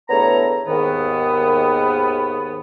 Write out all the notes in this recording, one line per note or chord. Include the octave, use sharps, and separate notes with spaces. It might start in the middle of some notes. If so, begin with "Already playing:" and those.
E2 G2 A3 B3 C#5 A#5
D#2 G#2 D#3 B3